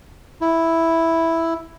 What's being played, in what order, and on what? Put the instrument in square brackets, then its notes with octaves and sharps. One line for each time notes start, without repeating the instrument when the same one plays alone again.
[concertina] E4